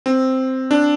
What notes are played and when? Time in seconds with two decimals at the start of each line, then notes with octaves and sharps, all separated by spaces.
0.06 C4
0.71 D4